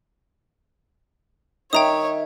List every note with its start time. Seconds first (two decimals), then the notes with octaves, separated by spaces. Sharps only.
1.73 D#3 C#5 E5 G5 A#5 D#6